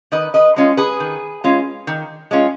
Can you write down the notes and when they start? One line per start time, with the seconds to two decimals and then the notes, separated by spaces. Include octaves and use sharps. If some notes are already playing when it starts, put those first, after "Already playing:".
0.12 D#3 B4 D#5
0.34 B4 D#5
0.56 G#3 C#4 F4
0.77 G#4 B4
1.00 D#3
1.44 G#3 C#4 F4
1.87 D#3
2.31 G#3 C#4 F4